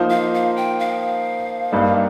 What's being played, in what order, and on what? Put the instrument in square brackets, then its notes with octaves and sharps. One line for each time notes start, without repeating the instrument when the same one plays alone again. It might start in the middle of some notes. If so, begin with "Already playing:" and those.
Already playing: [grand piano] F3 A#3 D#4 C5 D#5
[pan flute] F5
F5
G5
F5
[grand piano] G2 G3 A#3 D#4